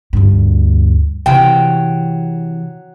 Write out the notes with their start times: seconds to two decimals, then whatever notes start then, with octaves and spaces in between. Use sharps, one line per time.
0.13 D2 G2
1.26 C3 E3 F#3 G5